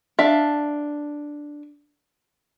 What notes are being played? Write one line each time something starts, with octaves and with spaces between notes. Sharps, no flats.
D4 E5 F5